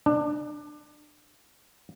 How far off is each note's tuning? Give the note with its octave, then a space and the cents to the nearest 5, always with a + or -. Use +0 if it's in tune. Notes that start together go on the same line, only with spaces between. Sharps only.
D4 +25